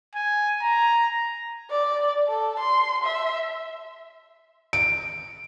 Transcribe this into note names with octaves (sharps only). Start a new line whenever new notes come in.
G#5
A#5
D5
A4
C6
E5
D7